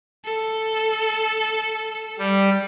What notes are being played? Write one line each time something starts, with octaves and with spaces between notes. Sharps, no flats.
A4
G3